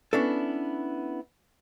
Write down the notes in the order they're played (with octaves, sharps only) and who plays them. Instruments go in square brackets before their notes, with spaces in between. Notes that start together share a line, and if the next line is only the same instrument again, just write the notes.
[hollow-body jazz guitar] B3 C#4 D4 E4 A4